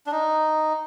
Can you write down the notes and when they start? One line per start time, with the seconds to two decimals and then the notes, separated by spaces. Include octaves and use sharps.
0.07 D4
0.12 D#4